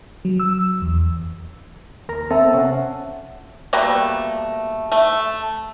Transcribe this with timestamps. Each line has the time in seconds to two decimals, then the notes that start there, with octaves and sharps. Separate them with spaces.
0.25 F#3
0.40 E6
0.82 E2
2.09 D#2 A#4 A#5
2.31 B3 C4 A4 E5 A5 E6
2.54 C3 C#4 C5 F#5
3.73 B2 G3 A3 A#3
4.92 A3